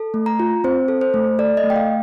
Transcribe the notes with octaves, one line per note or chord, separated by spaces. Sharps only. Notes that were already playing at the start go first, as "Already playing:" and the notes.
Already playing: A4
A3
A#5
F4
C4 C5
A4
C5
A3
A4 D5
D#5
A3
G5
F5